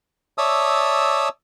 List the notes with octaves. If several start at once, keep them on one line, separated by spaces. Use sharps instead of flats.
C#5 D5 E5 A5 D#6 E6